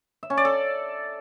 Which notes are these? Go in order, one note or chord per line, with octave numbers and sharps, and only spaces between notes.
E5
C#4
D5
A4